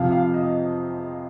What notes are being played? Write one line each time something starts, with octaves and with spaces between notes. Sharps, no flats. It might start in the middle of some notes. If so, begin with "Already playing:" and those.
Already playing: F2 C3 F3 F5
F5
D#5